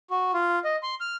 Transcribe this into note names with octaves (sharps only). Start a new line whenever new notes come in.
F#4
F4
D#5
C6
F6